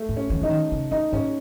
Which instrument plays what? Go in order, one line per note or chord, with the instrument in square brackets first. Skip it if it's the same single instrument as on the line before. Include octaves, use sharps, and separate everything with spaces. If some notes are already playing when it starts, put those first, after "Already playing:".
Already playing: [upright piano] A3
[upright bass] A2
[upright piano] C#4
[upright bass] D#3
[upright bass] E3 [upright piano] D#4
[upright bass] D#3
C#3
[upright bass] A2 [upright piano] D#4
[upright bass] G#2 [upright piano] C#4